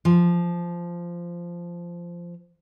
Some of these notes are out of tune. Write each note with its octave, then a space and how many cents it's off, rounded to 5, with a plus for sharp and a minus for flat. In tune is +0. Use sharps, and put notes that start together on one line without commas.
F3 -10